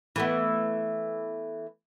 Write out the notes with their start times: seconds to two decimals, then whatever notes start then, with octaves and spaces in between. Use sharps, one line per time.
0.16 E3 A3 B3